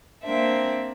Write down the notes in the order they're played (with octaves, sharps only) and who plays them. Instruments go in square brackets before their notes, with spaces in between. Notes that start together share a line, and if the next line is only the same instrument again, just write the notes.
[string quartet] A#3 C4 D4 E5